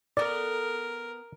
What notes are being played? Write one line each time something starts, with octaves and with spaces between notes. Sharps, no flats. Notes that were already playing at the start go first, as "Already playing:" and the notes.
B3 A4 A#4 D5